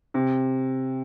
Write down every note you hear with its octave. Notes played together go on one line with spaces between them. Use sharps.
C3